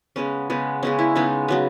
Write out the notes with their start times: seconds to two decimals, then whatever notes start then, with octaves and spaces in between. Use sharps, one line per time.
0.16 C#3 G#3 B3 C#4
0.50 C#3 G#3 B3
0.83 C#3 G#3 B3 C#4
0.99 E4
1.15 C#3 G#3 B3 D#4
1.48 C#3 F#3 B3